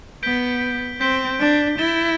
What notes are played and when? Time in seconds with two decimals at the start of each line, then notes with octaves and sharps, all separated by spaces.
0.23 B3 G6 B6 D7 G7
1.00 C4 G6 B6 D7 G7
1.40 D4
1.78 E4 A6 E7 G7